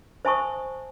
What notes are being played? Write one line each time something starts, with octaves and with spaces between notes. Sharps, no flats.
C5 E5 G#5 A5 C#6 D#6